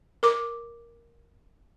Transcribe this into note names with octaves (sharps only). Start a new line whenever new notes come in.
A#4 D6